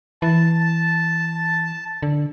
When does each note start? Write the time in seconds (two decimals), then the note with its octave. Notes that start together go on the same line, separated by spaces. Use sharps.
0.22 E3 A5
2.03 D3